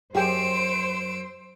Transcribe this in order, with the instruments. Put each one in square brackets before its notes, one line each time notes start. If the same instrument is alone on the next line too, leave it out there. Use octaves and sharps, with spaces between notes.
[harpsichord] F#2 [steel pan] G4 G#4 G5 [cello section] C5 [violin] E6 D7